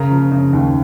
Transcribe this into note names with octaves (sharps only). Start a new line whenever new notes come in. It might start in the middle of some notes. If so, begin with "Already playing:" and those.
Already playing: C#3 A#4 A#5
F3
C#3
D#2